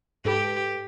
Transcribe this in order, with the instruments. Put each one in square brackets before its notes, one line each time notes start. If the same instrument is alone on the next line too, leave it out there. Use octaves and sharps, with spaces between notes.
[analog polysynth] G#2 A4 B4 [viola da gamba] G4